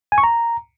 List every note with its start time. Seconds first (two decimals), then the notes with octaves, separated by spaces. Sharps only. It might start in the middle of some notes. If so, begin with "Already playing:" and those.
0.12 G#5
0.18 C#6
0.23 A#5